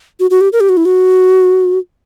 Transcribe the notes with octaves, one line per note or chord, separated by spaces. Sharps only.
F#4
F#4
G4
A#4
G4
F#4
E4
F#4